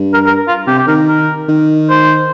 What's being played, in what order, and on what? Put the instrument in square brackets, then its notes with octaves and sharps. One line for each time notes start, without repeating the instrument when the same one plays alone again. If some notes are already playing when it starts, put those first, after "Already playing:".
Already playing: [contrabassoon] G2
[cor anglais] A#4
A#4
F4
[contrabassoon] C3 [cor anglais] G4
[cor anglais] G4
[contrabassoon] D#3 [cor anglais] A#4
[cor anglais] A#4
[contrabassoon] D#3
[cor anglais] C5